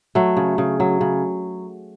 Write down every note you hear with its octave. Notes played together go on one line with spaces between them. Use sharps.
F#3 A3
C#3
C#3
F#3
C#3